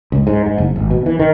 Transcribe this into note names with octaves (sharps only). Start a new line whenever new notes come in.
C#2
G#2
G#2
F#1
G#1
B2
E3
D#3